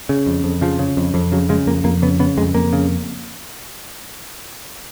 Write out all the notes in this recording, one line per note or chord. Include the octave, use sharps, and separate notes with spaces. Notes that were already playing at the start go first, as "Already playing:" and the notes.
C#3
F2
F2
C#3 F3
C#3
F2
F2
C#3 F#3
C#3 G#3
F2 A#3
F2 A#3
C#3 B3
C#3 B3
F2 G#3
F2 A#3
C#3